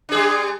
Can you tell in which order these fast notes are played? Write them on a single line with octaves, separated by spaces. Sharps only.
D4 G#4 G3